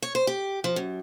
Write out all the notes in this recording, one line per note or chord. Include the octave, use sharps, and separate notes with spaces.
C#5
C5
G4
F3
F#2